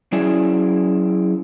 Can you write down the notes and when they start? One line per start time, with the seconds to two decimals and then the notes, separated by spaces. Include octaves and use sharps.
0.12 F#3 C#4 E4 G#4 D5 G#5